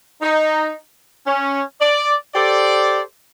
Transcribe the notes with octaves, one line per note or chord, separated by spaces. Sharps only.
D#4
C#4
D5
G4 A4 C5 D5